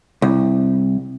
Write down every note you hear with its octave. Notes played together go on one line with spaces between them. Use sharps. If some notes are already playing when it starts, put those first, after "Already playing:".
C2